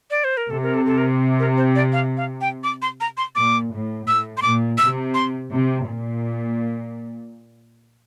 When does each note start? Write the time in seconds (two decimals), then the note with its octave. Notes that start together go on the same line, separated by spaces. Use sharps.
0.10 D5
0.24 C5
0.37 A#4
0.50 C3 A4
0.63 A#4
0.74 A4
0.86 A4
0.98 A#4
1.39 A#4
1.57 C5
1.76 D5
1.93 F5
2.17 F5
2.41 G5
2.64 D6
2.82 C6
3.01 A#5
3.17 C6
3.35 A#2 D6
3.72 A2
4.07 A2 E6
4.37 C6
4.42 A#2 D6
4.78 C3 E6
5.14 C6
5.50 C3
5.86 A#2